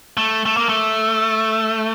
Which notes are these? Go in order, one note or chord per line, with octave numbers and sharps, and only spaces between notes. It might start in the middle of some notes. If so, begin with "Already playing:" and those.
A3
A3
A#3
A3